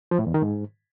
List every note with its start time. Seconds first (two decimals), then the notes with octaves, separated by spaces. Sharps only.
0.11 F3
0.19 A2
0.27 E2
0.34 D#3
0.42 G#2